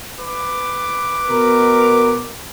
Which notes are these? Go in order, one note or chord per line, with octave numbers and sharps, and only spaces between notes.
B4 D6
B2 A#4